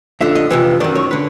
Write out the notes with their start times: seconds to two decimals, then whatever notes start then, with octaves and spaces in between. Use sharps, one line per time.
0.21 F2 D3 E5
0.35 D#5
0.50 F2 C3 E3 D#5
0.80 F#2 D#3 D5
0.95 C#5
1.11 D3 B4